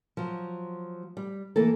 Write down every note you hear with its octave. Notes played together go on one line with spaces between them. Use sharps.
F3 F#3
G3
E3 A#3 A4